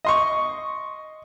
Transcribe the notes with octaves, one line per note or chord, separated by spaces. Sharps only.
D#5 C6 C#6